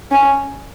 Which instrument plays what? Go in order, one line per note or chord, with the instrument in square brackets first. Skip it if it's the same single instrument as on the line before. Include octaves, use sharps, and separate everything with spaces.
[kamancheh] C#4